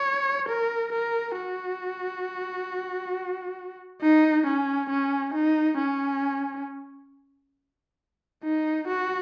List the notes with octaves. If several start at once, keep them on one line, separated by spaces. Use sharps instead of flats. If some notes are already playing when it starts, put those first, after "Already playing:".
Already playing: C#5
A#4
A#4
F#4
D#4
C#4
C#4
D#4
C#4
D#4
F#4